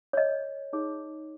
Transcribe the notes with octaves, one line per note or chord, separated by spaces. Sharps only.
C#5
D#5
D#4 G#4 C#5